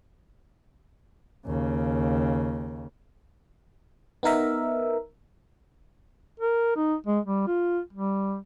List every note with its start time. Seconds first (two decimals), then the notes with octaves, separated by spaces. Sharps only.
1.46 D#2 C#3
4.23 B3 D#4 A#4 E5
6.40 A#4
6.76 D#4
7.06 G#3
7.25 G3
7.47 F4
7.93 G3